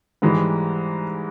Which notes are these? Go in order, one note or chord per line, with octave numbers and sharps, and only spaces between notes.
G#2 E3 G3 G#3